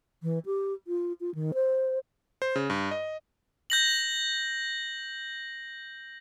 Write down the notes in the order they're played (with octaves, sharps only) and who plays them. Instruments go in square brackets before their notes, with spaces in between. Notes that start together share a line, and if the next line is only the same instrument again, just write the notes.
[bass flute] E3
G4
F4
F4
D#3
C5
[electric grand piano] C5
C#3
G2
D#5
[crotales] G6 A#6 F#7